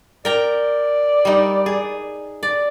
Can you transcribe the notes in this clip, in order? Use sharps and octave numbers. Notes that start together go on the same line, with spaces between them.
A#4 D5 G5 A#5
G3 D#4
G#4
D5